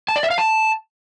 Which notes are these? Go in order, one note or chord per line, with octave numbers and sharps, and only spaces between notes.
A5
D5
E5
F5
A5